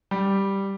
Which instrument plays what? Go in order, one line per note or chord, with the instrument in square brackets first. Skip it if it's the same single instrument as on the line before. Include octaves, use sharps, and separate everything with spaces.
[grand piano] G3